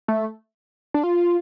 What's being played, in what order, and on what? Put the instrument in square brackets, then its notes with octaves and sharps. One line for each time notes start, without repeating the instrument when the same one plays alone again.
[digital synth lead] A3
D4
F4